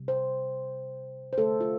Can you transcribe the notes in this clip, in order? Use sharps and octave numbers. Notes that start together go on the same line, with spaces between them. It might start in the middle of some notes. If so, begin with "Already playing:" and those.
Already playing: C3 G3
C5
C5
D3 A3 A4
F4